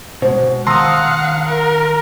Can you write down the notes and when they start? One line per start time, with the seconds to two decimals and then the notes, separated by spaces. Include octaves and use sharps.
0.22 B2 G#3 C5
0.67 D#3 F5 F#5 A5 A#5 C6 D#6 E6
1.47 A#4